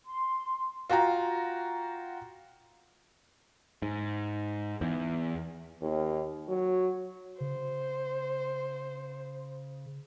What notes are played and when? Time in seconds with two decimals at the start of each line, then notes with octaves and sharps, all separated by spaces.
0.06 C6
0.89 F4 F#4 G5 A#5
3.82 G#2
4.81 E2
5.82 D#2
6.48 F#3
7.41 C#3 C5